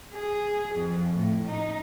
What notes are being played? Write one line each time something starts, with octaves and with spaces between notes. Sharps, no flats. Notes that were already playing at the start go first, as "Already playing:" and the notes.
G#4
F2
A2
D#4